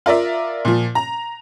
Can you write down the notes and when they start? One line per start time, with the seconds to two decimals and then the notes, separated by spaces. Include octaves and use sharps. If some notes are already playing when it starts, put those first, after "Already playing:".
0.06 F4 A#4 D5 E5
0.65 A#2 F3
0.95 A#5